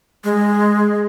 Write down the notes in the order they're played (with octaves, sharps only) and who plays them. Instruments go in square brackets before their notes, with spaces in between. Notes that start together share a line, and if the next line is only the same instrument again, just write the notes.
[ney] G#3